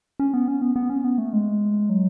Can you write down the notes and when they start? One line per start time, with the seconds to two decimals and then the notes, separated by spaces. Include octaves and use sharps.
0.20 C#4
0.34 B3
0.48 C#4
0.62 B3
0.76 B3
0.90 C#4
1.04 B3
1.18 A3
1.33 G#3
1.90 F#3